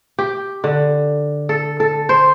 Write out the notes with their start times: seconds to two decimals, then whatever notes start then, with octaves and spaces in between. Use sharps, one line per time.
0.19 G4
0.64 D3
1.49 A4
1.80 A4
2.09 C5